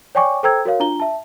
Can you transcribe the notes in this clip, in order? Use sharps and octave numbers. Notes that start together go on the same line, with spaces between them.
C#5 D5 G5 G#5 C#6 D6
A4 C5 G5 A#5 E6 G#6
F#4 A#4 C#5 F5
D4 F4 A#5 G7
E5 A5